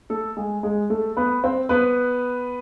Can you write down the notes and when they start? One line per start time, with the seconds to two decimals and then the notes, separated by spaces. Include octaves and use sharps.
0.10 A3 A4
0.37 G#3 G#4
0.63 G#3 G#4
0.90 A3 A4
1.17 B3 B4
1.44 C4 C5
1.69 B3 B4